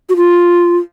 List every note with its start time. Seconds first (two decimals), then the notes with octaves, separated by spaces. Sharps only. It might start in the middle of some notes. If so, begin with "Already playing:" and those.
0.09 F#4
0.16 F4